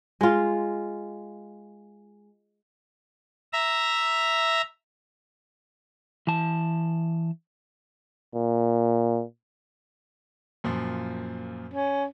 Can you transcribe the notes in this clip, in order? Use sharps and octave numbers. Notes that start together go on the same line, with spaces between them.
G#3 F4
E5 A#5
E3 A5
A#2
F#2 A#2 F3
C#4